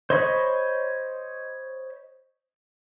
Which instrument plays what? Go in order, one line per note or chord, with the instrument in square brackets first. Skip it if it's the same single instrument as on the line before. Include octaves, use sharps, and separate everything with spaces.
[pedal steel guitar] C5 C#5 D#5 B5 C#6